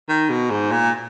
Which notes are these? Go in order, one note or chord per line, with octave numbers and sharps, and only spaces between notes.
D#3
B2
G#2
A#2